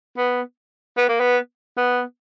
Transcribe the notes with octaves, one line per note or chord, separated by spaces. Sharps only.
B3
B3
A#3
B3
B3